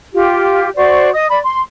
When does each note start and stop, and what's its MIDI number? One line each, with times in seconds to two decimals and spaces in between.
0.14 0.69 65
0.14 0.69 67
0.76 1.11 66
0.76 1.11 72
0.76 1.11 74
0.76 1.11 85
1.13 1.26 75
1.13 1.26 87
1.30 1.39 74
1.30 1.39 83
1.44 1.61 84